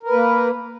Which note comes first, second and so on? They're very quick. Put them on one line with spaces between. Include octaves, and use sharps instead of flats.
A#4 B4 A#3